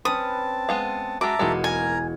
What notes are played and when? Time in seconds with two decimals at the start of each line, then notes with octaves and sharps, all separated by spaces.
0.05 C4 C#4 B4 A5 D#6
0.69 G#3 B3 F5
1.21 G#3 F#4 E5 A5 A#5 D6
1.39 E1 G#3 A#3 D#4 F#4
1.64 A#4 G#5 A#5 G#6